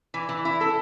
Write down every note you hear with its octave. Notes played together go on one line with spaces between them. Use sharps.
E3
E3
E4
A4